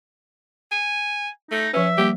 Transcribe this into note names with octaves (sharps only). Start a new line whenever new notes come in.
G#5
A3 D#4
F3 C#4 B4 E5
G3 A#3 G4